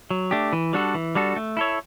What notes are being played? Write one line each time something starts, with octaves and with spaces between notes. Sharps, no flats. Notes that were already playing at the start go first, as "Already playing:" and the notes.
F#3
A3 D4 G4
E3
G3 D4 F#4 A4
E3
G3 D4 F#4 A4
A3
E4 A4 C#5